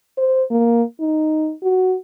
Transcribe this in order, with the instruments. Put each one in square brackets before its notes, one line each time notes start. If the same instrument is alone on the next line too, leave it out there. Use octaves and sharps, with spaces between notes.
[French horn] C5
A#3
D#4
F#4